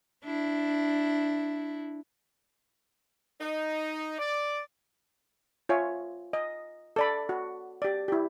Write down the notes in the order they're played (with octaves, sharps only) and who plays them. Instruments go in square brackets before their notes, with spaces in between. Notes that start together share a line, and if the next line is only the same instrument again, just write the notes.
[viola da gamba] D4 E4
[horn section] D#4
D5
[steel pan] F4 C#5 E5 G#5
D#5
A4 D5 B5
F#4
G4 D5
E4 G4